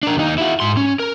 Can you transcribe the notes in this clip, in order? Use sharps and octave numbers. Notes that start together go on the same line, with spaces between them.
D4 A#4
D#2 D#4
E4 F#4
G#2 C6
C#4
A#4